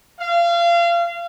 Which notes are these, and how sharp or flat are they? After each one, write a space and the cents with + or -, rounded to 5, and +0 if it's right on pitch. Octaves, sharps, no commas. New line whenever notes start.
F5 -30